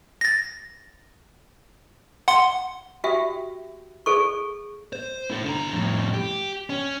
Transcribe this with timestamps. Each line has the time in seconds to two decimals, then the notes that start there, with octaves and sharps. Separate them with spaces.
0.21 A6 A#6
2.28 F#5 C6
3.04 F#4 G4 E5 G5
4.06 G#4 A4 C#6
4.93 C5
5.31 E4 A4
5.45 D3 A#5
5.73 F2 A2
6.14 G4
6.70 C#4